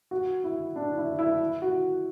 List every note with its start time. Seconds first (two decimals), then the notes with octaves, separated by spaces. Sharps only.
0.11 F#4
0.44 E4
0.76 D4
0.98 E4
1.19 E4
1.62 F#4